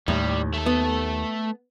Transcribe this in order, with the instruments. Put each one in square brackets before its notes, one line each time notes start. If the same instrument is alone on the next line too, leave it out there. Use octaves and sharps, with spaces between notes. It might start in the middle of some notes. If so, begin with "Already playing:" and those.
[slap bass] D#2 [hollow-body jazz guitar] A2 [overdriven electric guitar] G3
[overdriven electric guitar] A3 A4
[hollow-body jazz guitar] B3